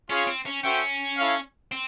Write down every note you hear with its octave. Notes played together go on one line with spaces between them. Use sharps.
C#4 F4 G#4 C#5 F5
C4
C#4
C#4 F#4 A4 C5 E5 G5
E4 A4 C#5 F5
C4